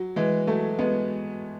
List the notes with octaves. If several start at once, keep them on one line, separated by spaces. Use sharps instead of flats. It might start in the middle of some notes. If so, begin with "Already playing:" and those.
Already playing: F#3
E3 G#3
F#3 A3
G#3 B3